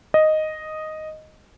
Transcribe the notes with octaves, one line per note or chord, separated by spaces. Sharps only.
D#5